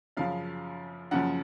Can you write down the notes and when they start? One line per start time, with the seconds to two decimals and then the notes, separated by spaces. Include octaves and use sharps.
0.17 F#2 C#3 F3 F5
1.11 F#2 C#3 F3 F#5